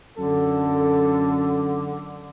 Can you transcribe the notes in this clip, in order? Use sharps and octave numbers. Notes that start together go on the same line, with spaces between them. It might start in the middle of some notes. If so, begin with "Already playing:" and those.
F#2 D3 A4